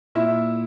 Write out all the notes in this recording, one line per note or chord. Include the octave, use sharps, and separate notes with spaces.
A#2 E4 E5